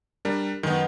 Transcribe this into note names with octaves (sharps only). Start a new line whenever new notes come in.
G3 D4 A#4
F#2 D#3 B3 D#4